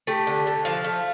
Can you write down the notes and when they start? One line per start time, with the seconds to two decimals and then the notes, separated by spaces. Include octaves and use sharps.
0.07 A3 G4
0.27 D3
0.47 D3
0.65 F3 F5
0.84 A3